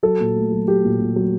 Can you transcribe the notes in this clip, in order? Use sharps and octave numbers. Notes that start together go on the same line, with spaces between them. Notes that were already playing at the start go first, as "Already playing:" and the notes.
F#3 A4
A#2
A3
F#3
F#3 G4
A#2
A#2
F#3